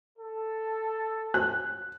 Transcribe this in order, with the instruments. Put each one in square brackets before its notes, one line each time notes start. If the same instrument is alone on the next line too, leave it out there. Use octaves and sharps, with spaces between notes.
[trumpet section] A4
[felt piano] F#6